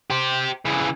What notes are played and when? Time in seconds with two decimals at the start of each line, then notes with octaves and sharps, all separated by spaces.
0.10 G4 C5
0.65 C#3 E3